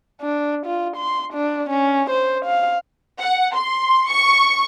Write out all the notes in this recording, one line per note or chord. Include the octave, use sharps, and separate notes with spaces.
D4
F4
C6
D4
C#4
C5
F5
F#5
C6
C#6